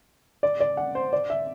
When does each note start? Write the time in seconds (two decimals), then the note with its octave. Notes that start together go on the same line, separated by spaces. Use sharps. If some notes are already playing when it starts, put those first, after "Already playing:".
0.43 D5
0.60 D5
0.77 F#5
0.95 C5
1.13 D5
1.30 E5